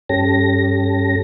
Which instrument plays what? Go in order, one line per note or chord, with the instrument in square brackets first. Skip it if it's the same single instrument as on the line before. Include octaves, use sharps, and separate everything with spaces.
[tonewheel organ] G2 C#4 G4 A4 A#6